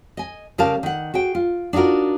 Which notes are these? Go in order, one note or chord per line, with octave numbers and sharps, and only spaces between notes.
D#5 G#5
C#3 G3 A#4 D5 F5 A5
D#3 F#5
F#4 G#4 G5
F4
D4 D#4 F4 F#4 A#4